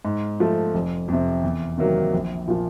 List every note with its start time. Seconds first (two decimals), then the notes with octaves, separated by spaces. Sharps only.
0.05 G#2
0.40 F3 A3
0.74 F1
1.08 F2 C3
1.43 E2
1.78 C3 D#3 F#3 A#3
2.13 A#1
2.48 A#2 F3